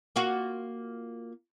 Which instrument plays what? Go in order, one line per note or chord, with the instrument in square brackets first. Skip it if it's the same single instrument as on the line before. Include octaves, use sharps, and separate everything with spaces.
[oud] A#3 F4 F#4